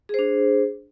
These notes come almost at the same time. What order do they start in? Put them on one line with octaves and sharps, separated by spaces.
G#4 C5 D4